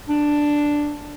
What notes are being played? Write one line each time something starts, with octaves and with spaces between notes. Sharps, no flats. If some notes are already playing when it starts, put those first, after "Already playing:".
D4